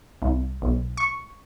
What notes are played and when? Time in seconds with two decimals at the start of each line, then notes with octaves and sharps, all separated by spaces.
0.22 C2
0.62 B1
0.97 C#6